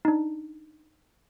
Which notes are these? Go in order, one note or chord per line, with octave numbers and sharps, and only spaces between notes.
D4 D#4